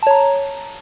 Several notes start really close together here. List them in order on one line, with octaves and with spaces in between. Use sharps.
A5 C#5 A#5